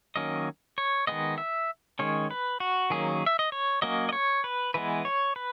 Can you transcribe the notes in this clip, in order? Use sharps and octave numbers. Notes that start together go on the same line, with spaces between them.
D#3 F#3 A#3 C#4 D#5
C#5
D#3 G#3 B3 D#5
E5
D#3 G#3 C#4 C#5
B4
F#4
D#3 F#3 A#3 C#4 G#4
E5
D#5
C#5
F#3 A#3 C#4 D#5
D#5
C#5
B4
E3 G#3 B3 B4
C#5
B4